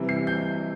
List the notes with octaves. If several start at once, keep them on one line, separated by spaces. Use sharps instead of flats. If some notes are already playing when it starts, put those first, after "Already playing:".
Already playing: C3 E3 G3
C7
G6